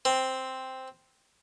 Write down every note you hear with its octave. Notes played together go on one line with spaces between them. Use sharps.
C4